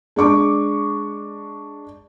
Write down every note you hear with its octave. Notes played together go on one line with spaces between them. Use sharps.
G#3 D4 C#6 D6